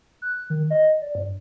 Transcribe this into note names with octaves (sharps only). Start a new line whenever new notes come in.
F#6
D#3
D#5
D5
G2